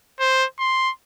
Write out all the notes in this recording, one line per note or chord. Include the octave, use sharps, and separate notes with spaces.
C5
C6